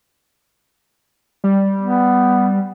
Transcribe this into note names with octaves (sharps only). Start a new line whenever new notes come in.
G3
B3